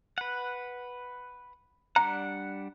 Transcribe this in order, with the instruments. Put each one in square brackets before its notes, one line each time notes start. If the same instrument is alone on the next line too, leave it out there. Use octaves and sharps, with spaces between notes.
[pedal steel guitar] B4 F#5
[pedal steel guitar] G3 D4 F#5 [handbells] A#5